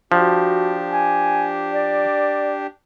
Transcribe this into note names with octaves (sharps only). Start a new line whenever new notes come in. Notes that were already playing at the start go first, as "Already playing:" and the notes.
F3 D4 F#4 G4
G#5
D5